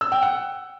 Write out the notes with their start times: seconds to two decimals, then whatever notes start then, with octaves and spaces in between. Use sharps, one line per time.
0.01 E6
0.12 G5
0.23 F#5